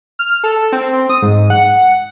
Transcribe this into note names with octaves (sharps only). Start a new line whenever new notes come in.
F6
A4
C4
D#6
G#2
F#5